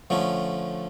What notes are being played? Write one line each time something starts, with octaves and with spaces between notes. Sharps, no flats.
D3 F3 A3 C#4